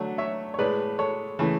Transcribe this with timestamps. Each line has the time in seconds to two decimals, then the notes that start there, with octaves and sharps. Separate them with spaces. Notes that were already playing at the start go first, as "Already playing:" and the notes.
Already playing: D3 F#3 A3
0.18 C#5 E5
0.54 C#5
0.59 A2 G#3 B4 D5
0.99 A4 C#5
1.39 C#3 E3 A3